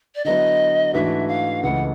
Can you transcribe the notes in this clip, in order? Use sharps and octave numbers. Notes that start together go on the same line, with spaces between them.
D5
D3 F#3 B3 E4 D#5
G#2 E3 A3 D4 F#4 E5
F5
C#2 C#3 E3 A3 F#5